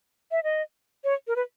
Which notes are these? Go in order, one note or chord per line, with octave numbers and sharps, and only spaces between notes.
E5
D#5
C#5
A#4
B4